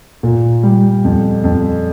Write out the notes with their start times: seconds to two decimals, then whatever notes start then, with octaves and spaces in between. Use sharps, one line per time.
0.23 A#2
0.63 G3
1.05 F2
1.44 F2